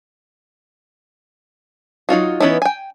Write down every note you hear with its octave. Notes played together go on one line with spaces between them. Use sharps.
F#3 D#4 F4 F#4
E3 B3 C#4 D#4 E4
G5 G#5